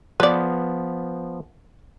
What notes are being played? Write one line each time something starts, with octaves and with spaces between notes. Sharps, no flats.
F3 B3 B4 D5